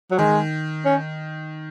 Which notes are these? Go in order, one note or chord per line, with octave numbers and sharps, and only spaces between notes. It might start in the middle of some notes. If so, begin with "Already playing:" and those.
F#3
D#3 G#3
C#4